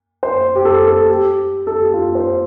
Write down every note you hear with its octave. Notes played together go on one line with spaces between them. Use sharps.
C5
G4
A4
A4
G4
A4
G4
F4
C5